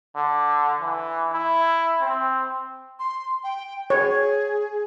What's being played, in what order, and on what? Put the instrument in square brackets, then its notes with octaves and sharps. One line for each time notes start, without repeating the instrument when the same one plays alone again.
[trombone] D3
E3
E4
C4
[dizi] C6
G5
[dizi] G#4 [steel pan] C#5